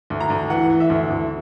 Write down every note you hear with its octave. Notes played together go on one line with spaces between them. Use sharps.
D2
A#5
D2
E3 F#5
E3
E5
D2
D2